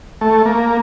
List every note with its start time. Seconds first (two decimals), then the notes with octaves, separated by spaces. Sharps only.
0.21 A3
0.45 A#3